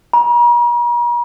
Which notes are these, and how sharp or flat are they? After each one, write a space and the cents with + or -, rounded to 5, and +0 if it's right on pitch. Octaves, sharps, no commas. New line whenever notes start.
A#5 +45